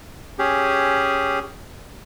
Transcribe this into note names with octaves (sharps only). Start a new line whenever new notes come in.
C#4 G4 G#4